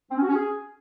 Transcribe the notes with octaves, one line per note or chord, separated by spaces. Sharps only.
C4
C#4
F#4
C#4
G#4